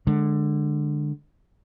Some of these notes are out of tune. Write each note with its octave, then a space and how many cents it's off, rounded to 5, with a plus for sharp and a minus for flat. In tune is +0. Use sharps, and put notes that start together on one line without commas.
D3 +15 G#3 +0